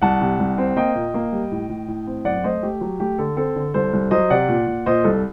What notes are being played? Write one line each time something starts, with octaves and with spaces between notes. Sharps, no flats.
C2 F#5 A5
C3
C2
C4
A#3 D#5 G5
A#2
A#3
G3
A2
A2
A2
C4
F#2 D5 F#5
A3 C5 D#5
A3 G4
F#3
A3 G4
D3 A4
C4 A4
D3
C2 A4 C5
C2
F#3 C5 D#5
C3 D5 F#5
A#2
A#2
A#2 C5 D#5
C2 A4